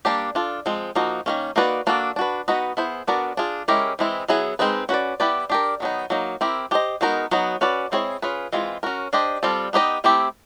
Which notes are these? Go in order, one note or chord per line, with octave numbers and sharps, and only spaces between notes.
G3 A#3 D4 G4
D4 F4 A4
F3 G#3 C4
F3 A#3 D#4 F#4
D#3 F#3 A#3 C#4
A#3 D#4 F#4 B4 D5
A#3 D4 F#4 A4
D4 F#4 B4
B3 D#4 F#4 B4 D#5
B3 E4 G#4 C5
B3 D4 F#4 A#4 D5
D4 F4 G#4
G#3 C#4 E4 G4 A#4
E3 G#3 C4 E4
F#3 B3 E4 G#4
G#3 C4 D#4 G#4 B4
C#4 F#4 B4 D5
B3 E4 G4 B4 D5
D4 G4 A#4
D#3 F#3 B3 D#4
F#3 A#3 D#4
C4 E4 G4 A#4
D4 G4 C5 D#5
G#3 B3 D#4 F#4 A#4
F#3 B3 D#4 F#4
C#4 F#4 B4 D5
G#3 C4 E4 G#4 C#5
C#4 F4 G#4 B4
E3 G#3 C4 F4 G#4
C#4 F#4 A#4
D4 G4 C5 D#5
G3 C4 F4 A4
B3 D#4 G4 C5 D#5
A3 C4 E4 G4